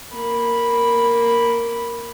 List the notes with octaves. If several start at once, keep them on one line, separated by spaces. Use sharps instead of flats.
A#3 B5